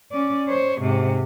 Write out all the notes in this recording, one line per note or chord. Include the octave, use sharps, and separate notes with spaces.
C#4 D5
C5 C#5
G#2 C3